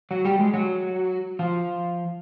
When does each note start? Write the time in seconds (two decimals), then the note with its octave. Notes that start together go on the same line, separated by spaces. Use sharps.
0.11 F#3 F#4
0.25 G3 G4
0.39 G#3 G#4
0.54 F#3 F#4
1.39 F3 F4